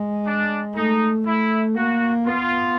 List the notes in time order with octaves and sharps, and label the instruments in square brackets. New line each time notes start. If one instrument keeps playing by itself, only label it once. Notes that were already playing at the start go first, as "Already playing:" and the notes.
Already playing: [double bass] G#3
[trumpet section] D4
[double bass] A3 [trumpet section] D#4
[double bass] A3 [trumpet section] E4
[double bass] A#3 [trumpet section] F#4
[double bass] B3 [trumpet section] F4